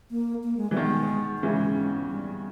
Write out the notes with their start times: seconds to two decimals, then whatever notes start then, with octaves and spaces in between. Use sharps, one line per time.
0.11 A#3
0.44 A#3
0.57 G#3
0.70 E3 G3
0.76 B2 D#3
0.83 G#3
1.37 A#3
1.42 C#3 E3 G#3
2.08 G3